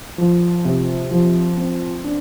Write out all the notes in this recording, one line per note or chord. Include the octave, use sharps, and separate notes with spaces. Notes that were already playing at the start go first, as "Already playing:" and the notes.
F3
C3
F3
C4
D4